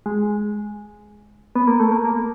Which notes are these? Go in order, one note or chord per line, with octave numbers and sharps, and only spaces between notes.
G#3
B3
A#3
A3
A#3
A#3